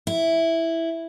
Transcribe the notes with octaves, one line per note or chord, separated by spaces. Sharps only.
E4